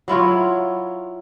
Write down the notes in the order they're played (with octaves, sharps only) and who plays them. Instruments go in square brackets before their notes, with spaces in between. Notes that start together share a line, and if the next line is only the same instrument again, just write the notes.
[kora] F#3 E4 F4 C#5